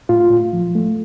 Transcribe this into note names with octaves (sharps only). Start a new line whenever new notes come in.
A2 F4
A2
F3
A3